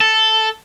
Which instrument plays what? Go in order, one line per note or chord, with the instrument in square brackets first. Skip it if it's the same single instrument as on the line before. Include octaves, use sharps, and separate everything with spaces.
[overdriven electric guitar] A4